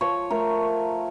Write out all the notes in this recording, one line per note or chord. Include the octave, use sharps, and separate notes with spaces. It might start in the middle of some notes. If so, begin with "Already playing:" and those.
F3 C#5
A3 A#4